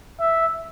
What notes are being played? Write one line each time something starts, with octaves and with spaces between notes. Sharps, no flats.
E5